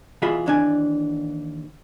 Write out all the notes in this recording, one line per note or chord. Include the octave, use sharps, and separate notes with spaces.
B2 E3 F4 G#4 E5 B5
D#2 E3 D4 D5 G#5